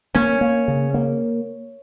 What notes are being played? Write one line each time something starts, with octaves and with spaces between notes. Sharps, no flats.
A#3 C#4
A#3
C#3
A#3